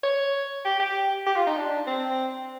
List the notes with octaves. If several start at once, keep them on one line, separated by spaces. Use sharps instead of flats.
C#5
G4
G4
G4
F4
D#4
D4
C4